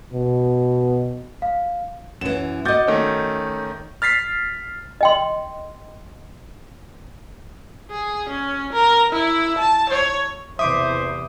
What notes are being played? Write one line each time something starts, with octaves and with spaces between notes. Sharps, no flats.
B2
F5
F#2 E3 E7
F#4 D#5 D6 G6 A6
D#3 A3 C#4
F6 A6 B6 C7
D#5 G5 C6
G#4
C#4
A#4
E4
A5
C#5
E2 C3 E3 C5 E5 D6 D#6